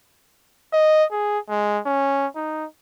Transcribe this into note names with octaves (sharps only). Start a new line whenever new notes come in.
D#5
G#4
G#3
C#4
D#4